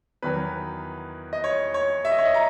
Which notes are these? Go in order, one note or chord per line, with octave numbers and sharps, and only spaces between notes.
E2 D#3 F#3 B4
D#5
C#5
C#5
E5
D#5
C#5
D#5
A#5